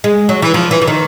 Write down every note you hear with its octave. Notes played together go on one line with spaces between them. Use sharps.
G#3
F#3
E3
F3
E3
E3
D#3